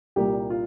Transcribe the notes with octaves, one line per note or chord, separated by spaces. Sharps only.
C2 A#2 G3 A#3 G4
F4